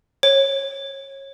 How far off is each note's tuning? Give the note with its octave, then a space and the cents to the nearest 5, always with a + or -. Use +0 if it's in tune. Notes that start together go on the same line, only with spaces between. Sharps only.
C#5 -25